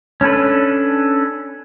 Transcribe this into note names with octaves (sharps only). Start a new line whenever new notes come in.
C#4 D4 A4 B4